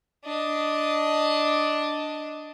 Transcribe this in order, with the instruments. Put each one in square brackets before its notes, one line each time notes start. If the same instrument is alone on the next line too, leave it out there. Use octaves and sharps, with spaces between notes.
[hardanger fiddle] D4 D#5